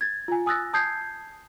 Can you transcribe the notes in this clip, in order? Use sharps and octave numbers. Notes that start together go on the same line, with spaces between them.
G#6 A6
F4 G#5
G#5 D#6 E6 F#6 A6 A#6
A5 D#6 G6 G#6 C7